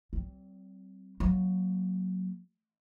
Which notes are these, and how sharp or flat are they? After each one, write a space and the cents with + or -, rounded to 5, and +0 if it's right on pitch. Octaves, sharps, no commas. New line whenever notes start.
G3 -45 C4 +0
F#3 +0 A#3 +0